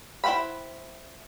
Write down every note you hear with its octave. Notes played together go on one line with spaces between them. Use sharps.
E4 C5 F#5 G5 B5